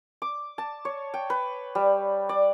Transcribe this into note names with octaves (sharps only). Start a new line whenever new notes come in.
D6
A5
C#5
G5
B4
G3
D5